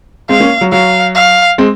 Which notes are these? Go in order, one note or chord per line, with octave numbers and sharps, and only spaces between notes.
G#3 C4 F5
A#3 C#4
F#3
F#3 F5
F5
G#3 C4